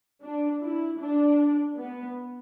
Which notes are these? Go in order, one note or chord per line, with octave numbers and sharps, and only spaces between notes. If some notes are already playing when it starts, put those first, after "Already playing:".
D4
E4
D4
B3